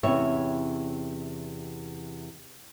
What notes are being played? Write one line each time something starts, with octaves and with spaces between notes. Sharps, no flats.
E2 C3 C#4 C#5 E5